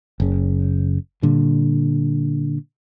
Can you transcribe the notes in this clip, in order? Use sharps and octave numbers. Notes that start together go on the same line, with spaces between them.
F#1 C#3
A#2 D3 G3